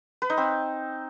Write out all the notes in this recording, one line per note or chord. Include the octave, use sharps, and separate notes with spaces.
B4
D#4
C4